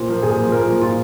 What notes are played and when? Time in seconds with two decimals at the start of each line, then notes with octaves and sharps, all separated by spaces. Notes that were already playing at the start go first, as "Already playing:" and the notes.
Already playing: A#2 C5
0.08 F3 A#3
0.22 A#2 G#4
0.38 F3 A#3
0.52 A#2 A#4
0.66 F3 A#3
0.81 A#2 F4